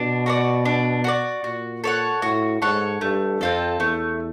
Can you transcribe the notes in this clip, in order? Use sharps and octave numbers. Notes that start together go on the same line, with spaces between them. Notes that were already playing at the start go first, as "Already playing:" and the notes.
Already playing: B2 D4
F#4 A4 D5
D4
F#4 A4 D5
A#2 F#4
A4 C#5 F#5
A2 F#4
G#2 A4 C#5 F#5
G2 A3
F2 C4 F4 A4
E2 A3